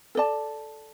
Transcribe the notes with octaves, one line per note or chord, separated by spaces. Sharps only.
A4 D5 A5